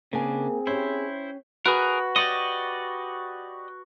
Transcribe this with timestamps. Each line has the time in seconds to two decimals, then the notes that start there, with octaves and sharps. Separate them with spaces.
0.13 C#3 A#3 C4 D4 G#4 A#4 G#5
0.67 C#4 E4 G4 C5
1.66 F#4 G#4 A#4 B4
2.16 G4 D5 D#5 C#6